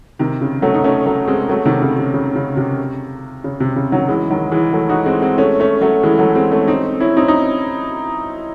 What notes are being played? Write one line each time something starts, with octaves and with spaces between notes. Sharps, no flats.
C3 D#3
C#3
F#3 A3
D#4
A3 C#4
F#3 A3
G#3 C4
F#3 A3
C3 D#3
C#3
C3
C#3
C#3
C3
C#3
C3
C#3
D#3 F#3
E3 G#3
D#3 F#3
E3 G#3
F#3 A3
D#4 F#4
G#3 C4
G#3 C4
A3 C#4
A3 C#4
F#3 A3
E3 G#3
F#3 A3
G#3 C4
A3 C#4
C4 D#4
C#4 E4
C4 D#4
D#4